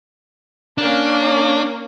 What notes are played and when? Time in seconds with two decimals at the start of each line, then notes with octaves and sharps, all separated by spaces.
0.78 A#3 C#4 D4